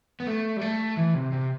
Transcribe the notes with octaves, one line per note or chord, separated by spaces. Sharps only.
B3
A3
G3
A3
E3
C3
C3